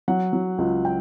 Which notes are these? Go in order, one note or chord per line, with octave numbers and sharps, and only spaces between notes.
F#3 F#5
F#3
C#2
G5